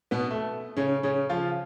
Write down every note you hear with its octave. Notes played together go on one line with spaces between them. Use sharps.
B2 B3
A3
C#3 C#4
C#3 C#4
F3 F4